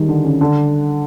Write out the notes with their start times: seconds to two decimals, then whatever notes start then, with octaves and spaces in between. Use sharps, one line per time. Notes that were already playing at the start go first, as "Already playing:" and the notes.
Already playing: D#3 G3 G#3
0.08 D3
0.24 C#3
0.41 D3